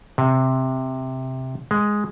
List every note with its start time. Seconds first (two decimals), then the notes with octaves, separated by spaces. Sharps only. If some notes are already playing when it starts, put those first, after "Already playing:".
0.18 C3
1.71 G#3